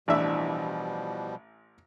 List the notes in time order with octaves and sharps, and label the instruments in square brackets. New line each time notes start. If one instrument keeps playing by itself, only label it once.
[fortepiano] A1 E5 [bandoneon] B2 F3 G3 [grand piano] E3 D4